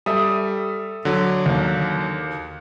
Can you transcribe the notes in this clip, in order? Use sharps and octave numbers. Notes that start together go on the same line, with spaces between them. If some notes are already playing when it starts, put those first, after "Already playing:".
G3 A4 E5 D#6
D3 F#3
D#2